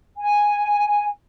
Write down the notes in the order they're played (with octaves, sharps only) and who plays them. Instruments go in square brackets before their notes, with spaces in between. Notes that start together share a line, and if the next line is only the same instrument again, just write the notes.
[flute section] G#5